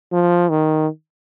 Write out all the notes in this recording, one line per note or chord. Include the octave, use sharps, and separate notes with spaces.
F3
D#3